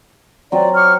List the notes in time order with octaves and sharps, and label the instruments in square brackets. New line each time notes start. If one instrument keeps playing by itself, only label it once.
[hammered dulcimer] F#3 C4 [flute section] D5
[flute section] C#6 D6 F6